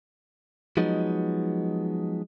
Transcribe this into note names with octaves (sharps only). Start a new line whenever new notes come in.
F3 F#3 G#3 B3 D#4